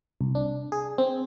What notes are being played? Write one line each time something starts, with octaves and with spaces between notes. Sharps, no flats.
C2
D4
G#4
C4